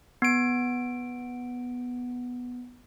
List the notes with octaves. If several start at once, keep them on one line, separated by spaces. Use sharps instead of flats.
B3 D7